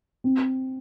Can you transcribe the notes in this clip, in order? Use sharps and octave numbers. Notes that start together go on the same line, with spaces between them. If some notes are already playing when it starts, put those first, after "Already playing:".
C4